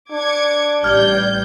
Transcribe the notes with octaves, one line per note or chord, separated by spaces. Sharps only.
D4 D6 G#6 C#7
A1 G3 D5 F6 G6 G#6 G7